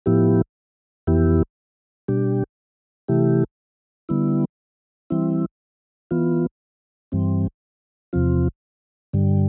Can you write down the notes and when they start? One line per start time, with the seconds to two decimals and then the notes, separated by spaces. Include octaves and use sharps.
0.06 A2 F3 B3 E4 G4
1.07 F2 E3 B3 E4 G4
2.08 B2 G3 D4 G4
3.08 C3 E3 A3 E4 G4
4.09 D3 G3 B3 E4
5.10 E3 G3 C4 E4
6.11 E3 B3 F4
7.12 G2 E3 G3 C4
8.13 E2 C3 F3 C4 F4
9.13 G2 D3 G3